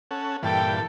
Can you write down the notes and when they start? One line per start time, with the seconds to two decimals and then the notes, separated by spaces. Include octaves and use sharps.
0.11 C#4 A4 F#5
0.43 G2 A#2 E3 A4 G5